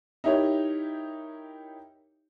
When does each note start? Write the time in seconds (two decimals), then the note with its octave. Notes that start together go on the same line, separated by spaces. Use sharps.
0.24 D#4 E4 G4 A#4 C#5